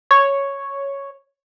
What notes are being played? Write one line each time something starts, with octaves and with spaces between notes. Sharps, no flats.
C#5